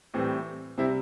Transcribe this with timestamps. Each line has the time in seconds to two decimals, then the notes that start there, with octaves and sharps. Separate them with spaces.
0.14 A2 E3 G3 C4
0.78 C3 G3 C4 E4